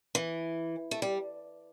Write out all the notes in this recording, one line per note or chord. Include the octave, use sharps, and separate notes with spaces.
E3
A3
G3